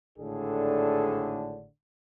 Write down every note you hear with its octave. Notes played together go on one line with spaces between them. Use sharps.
G#1 A2 D3 D4 G#4 A4